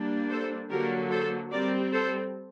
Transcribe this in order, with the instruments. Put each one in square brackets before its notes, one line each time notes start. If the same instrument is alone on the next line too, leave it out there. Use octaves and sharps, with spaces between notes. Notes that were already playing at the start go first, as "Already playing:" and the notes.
Already playing: [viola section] G3 A#3 D4
A4 C5
D3 F#3 A#3 G4 A#4
A4 C5
G3 C4 A#4 D5
A4 C5